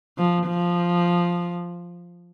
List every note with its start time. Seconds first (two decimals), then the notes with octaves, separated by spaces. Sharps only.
0.18 F3
0.47 F3